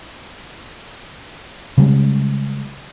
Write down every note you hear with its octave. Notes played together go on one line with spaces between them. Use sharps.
C#3 G3 G#3